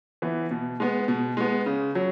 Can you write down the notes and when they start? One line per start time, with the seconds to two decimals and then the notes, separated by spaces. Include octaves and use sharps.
0.22 E3 B3
0.51 B2
0.80 G#3 B3
1.08 B2
1.37 G#3 B3
1.66 C#3
1.95 F#3